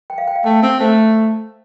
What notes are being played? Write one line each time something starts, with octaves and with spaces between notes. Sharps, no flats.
G5
F5
G5
F5
A3 G5
C4
A3 C5